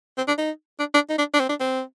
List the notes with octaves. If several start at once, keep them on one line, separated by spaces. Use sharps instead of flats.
C4
D4
D#4
D4
D4
D#4
D4
D4
C4
D4
C4